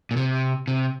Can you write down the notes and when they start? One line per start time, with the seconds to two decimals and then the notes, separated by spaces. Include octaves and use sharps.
0.11 A#2
0.17 C3
0.68 C3